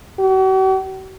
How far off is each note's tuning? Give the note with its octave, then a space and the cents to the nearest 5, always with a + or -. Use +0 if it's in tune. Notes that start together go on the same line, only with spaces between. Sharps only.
F#4 +45